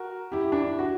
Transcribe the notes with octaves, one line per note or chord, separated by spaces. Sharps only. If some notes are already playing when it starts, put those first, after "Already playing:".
Already playing: F#4 A#4
E4 G4
D4
E4
F#4